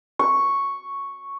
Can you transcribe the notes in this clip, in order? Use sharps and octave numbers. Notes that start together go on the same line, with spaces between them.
C#6